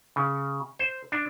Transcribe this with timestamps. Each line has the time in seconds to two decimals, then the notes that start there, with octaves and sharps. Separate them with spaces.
0.16 C#3
0.79 C5
1.12 D4